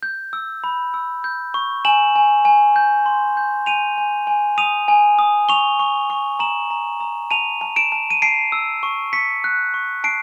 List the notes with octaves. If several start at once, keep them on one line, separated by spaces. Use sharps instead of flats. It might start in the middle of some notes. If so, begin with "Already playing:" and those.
G6
E6
B5
E6
G6
C#6
G#5 E7 F#7
G#5
G#5
G6
C6
G6
G#5 D#7 F7
G#5
G#5
D#6 D#7 F7
G#5
D#6
C#6 F7 G7
C#6
C#6
A#5 E7 F#7
A#5
A#5
A5 D#7 F7
A5
D7 E7
A5
D#7
A5 C7 D7
E6
C#6
C#6 B6 C#7
F#6
C#6
A5 C7 D7